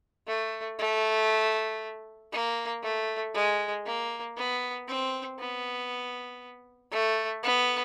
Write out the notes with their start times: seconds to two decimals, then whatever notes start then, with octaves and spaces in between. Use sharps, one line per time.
0.27 A3
0.79 A3
2.32 A#3
2.83 A3
3.35 G#3
3.86 A#3
4.37 B3
4.88 C4
5.39 B3
6.92 A3
7.43 B3